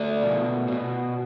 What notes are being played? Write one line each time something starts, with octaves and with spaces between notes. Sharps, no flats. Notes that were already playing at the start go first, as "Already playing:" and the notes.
Already playing: A3 D5
B2
B2